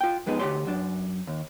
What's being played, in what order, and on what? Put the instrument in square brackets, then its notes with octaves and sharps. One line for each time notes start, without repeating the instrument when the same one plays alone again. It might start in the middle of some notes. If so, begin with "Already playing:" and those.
[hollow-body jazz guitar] F4 G5
F2 G#3 B3 D#4
D2 C#3 G4 C#5 C6
F#2 D4
D#2